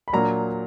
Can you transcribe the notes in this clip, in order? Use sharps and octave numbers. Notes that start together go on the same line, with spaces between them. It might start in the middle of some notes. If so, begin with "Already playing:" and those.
B5
A#2 F#3 A#3 D4 A#5